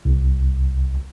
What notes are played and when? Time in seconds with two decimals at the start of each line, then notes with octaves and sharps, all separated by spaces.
0.05 C2